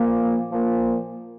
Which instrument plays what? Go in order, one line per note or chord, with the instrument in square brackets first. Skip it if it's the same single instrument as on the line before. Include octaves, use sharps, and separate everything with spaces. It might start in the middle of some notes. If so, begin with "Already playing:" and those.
Already playing: [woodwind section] A#2 F3 A#3
A#2 F3 A#3